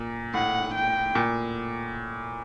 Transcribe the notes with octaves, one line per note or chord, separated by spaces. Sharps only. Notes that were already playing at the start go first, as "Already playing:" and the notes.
Already playing: A#2
A2 F#5
G5
A#2